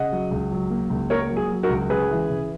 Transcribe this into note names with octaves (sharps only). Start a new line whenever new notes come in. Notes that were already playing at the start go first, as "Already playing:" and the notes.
Already playing: C#3 D#5 F#5
F#3
C#2
F#3
A#3
C#2
A#3 A#4 C#5
F#3
G#4
F#3
F#4 A#4
C#2
C#3 G#4 B4
E3
C#3